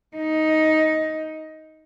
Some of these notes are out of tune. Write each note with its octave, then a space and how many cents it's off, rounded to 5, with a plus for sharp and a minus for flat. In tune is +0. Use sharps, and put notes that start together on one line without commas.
D#4 +10